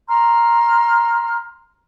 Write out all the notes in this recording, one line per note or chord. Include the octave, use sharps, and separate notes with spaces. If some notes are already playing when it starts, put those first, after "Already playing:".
A#5 C6 F6